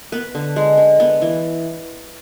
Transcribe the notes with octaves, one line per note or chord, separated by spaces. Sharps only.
B3 B4
D3
G#3
D3
B3
E3